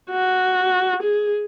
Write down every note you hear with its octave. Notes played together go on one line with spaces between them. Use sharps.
F#4
G#4